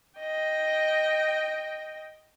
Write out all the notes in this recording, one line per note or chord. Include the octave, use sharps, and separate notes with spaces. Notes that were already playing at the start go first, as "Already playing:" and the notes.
D#5 G5